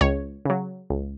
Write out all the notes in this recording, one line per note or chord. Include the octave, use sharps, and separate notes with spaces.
C#2 C#5
C#3 F#3
C#2